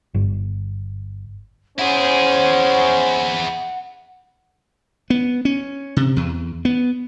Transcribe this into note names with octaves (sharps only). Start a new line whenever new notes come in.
G1
C#4 E4 G#4 C5 F#5
B3
C#4
C3
E2
B3